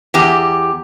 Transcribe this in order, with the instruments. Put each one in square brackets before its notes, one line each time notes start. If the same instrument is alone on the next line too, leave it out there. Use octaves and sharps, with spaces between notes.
[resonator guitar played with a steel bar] E2 G4